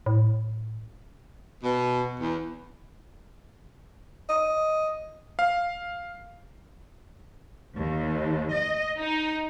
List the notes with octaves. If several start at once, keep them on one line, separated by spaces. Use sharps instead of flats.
A2
B2
E2
D#5
F5
D#2
D#5
D#4